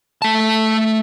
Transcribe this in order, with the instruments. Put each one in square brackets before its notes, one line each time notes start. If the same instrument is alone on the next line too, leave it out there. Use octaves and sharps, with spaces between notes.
[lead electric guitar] A3 A5